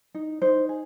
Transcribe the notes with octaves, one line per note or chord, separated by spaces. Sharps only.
D#4
D#4 C5
G#4